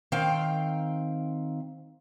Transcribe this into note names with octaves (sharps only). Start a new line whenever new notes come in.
D#3 C4 F5 G5